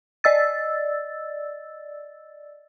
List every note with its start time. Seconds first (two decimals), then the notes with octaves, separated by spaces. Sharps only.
0.24 D5 D#5 E6 A6